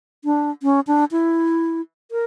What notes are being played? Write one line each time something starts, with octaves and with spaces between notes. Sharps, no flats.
D4
C#4
D4
E4
A#4